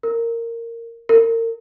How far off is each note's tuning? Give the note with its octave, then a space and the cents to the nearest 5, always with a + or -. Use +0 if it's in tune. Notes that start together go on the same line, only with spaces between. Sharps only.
A#4 -15
A#4 -35